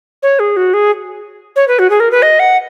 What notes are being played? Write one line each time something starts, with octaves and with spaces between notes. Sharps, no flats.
C#5
G#4
F#4
G#4
C#5
B4
F#4
G#4
A#4
B4
D#5
F#5